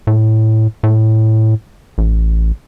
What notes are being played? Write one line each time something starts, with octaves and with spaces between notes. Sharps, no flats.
A2
A2
A1